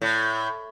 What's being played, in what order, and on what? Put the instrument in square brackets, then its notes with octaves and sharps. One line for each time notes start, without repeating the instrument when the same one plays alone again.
[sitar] A2